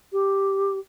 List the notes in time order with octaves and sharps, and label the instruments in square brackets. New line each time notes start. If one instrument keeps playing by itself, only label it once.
[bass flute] G4